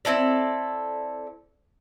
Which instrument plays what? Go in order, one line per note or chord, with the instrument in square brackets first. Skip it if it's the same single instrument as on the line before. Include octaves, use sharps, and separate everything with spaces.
[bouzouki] C4 E4 A4 D5